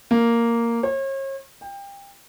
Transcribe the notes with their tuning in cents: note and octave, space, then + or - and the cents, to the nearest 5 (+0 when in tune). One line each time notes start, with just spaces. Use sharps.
A#3 -5
C#5 -40
G5 +25